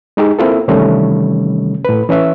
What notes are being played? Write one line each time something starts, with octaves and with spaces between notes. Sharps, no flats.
G#3 D#4 G4 G#4
A#3 C4 E4 F4 A4
C3 D#3 E3 G3 A3 C#4
A2 B4
E3 C#4 B4 E5